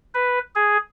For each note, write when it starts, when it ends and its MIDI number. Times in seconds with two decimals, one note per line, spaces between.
0.14 0.39 71
0.55 0.77 68